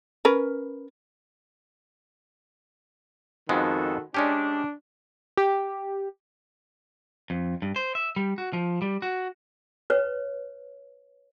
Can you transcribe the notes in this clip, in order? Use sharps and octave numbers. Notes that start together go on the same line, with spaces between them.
C#4 A#4 B4
F2 D#3 G#3 B3 F#4 A4
G#3 C#4 D4 G4
G4
F2
G2
C5
E5
G3
F#4
F3
G3
F#4
B4 C#5